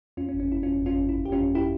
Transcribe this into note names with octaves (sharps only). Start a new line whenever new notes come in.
F2 C#4 F4
C#4
G1
C#4
G1 E4
F2 C#4 F4
G1
C#4 F4
G1
G1 E4
G1 G4
C#4 F4
F2
E4 G4